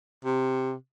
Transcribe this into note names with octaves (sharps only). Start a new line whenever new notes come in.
C3